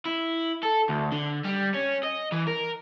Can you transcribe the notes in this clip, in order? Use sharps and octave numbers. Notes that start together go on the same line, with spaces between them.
E4
A4
D2
D3
G3
C#4
D#5
E3
A#4